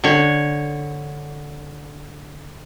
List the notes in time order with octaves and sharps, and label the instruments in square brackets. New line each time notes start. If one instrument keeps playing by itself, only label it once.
[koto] D3 C#5